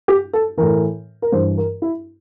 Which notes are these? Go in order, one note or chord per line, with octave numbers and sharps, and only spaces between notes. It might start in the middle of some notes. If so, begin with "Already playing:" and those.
G4
A4
A2 E3 A#4
A#4
G2 E3 C5
A#4
E4